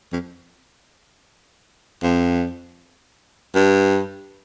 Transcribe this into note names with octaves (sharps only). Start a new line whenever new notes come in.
F2
F2
G2